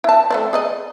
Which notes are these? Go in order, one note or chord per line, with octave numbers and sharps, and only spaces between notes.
E4 A5
A3 C4 D5
G#4 D5 D#5